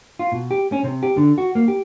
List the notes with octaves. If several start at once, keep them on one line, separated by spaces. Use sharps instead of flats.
F4
B2
G4
C#4
C3
G4
D3
F#4
A#3
G4